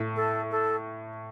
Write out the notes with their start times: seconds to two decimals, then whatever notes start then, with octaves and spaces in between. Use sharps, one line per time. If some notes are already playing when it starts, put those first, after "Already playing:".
Already playing: A2
0.16 A4
0.51 A4